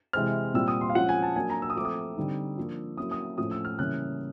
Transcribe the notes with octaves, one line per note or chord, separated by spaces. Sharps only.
C3 E3 G#3 C4 F6
A#2 G3 C4 F4 E6
D#6
C6
F5
F3 G#3 C#4 F4 F#5
G#5
A5
F#3 A#3 D4 G#5
A#5
E6
D#6
F3 A3 C4 D6 D#6
D3 G3 C4 D#4
F3 A#3 D4 F4
F#3 A#3 C#4 E4 D#6
D#6
A2 F3 A3 C#4 D#6
E6
F6
C#3 E3 G3 A#3 C#4 F#6